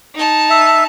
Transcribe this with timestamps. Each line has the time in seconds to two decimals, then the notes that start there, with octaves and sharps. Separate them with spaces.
0.15 D#4 A5
0.50 E5